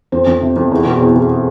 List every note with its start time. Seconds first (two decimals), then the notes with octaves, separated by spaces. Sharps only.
0.12 F2 C5
0.27 F2
0.42 C3
0.56 F2
0.72 E2
0.86 B2
1.00 E2
1.15 E2